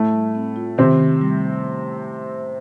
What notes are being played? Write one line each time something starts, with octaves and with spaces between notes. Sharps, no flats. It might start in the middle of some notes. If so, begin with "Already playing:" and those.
Already playing: A2 A3
G3
C4
F4
C3 D#3 C4
D#3
G3